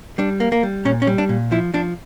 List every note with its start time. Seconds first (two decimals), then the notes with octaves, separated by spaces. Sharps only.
0.18 G3 D4
0.40 A#3
0.52 A#3
0.63 G3
0.85 A#2 C#4
1.02 C#4
1.07 G3
1.18 D4
1.29 A#2
1.52 F3 E4
1.74 F3 D4